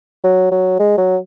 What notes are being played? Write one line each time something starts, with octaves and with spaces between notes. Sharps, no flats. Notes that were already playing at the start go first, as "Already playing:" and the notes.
F#3
F#3
G#3
F#3